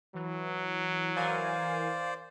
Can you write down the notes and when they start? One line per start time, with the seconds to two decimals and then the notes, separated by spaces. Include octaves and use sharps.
0.15 E3 F#3
1.16 E3 A#4 C5 D5 F5 G#5